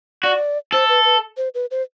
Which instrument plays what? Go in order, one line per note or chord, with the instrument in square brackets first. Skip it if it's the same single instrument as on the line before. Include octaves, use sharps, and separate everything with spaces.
[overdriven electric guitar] F#4 [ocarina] D5
[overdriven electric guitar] A4 [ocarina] C5
[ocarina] B4
B4
C5
B4
C5